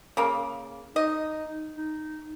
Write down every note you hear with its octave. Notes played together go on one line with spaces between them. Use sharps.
C#3 A#3
D#4 D#5
D#4